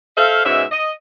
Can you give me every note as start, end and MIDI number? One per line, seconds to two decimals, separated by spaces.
0.17 0.43 69
0.17 0.43 72
0.17 0.43 76
0.17 0.43 77
0.45 0.63 44
0.45 0.63 47
0.45 0.63 61
0.45 0.63 76
0.71 0.92 75